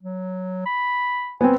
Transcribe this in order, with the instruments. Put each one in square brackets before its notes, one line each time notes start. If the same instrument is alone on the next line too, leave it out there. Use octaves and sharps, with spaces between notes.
[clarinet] F#3
B5
[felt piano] B3 C4 [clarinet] G#5